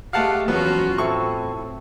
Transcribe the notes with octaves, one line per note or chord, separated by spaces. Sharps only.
G#3 A3 G4 F5 F#5 A5
E2 F3 F#3 B3 C#4 F4 F#4
A2 C4 E4 A4 C#6